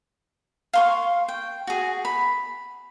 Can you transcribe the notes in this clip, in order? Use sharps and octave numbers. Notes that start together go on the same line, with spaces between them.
F5 C6 C#6
G5
F#4 G#4
B5